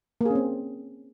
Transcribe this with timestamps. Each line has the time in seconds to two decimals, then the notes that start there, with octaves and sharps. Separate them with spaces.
0.21 A#3
0.25 G#4
0.30 C#4
0.35 C4